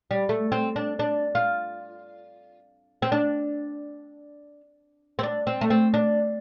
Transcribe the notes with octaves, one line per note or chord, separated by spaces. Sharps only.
G3
A3
C4
D4
D4
F4
C4
D4
C4
D4
C4
A3
C4
D4